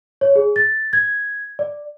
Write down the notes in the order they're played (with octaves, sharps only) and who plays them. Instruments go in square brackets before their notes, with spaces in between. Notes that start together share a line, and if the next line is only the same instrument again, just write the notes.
[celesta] C#5
G#4
A6
G#6
D5